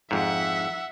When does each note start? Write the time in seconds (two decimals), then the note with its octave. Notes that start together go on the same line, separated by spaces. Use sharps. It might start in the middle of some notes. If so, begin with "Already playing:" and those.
0.11 F2 G#2 E5 F#5